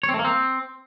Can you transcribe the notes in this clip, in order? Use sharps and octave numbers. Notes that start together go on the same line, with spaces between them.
C#5
C4
A3
A#3
C4